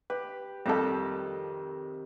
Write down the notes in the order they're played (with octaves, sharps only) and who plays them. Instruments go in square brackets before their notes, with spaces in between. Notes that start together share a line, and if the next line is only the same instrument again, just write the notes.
[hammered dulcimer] G4 [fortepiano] B4
[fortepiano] F2 G3 A4 [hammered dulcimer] C3 D#3